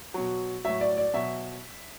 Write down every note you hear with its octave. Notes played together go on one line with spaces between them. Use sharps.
B2 F#3
A2 F#3 E5
D5
D5
B2 F#3 E5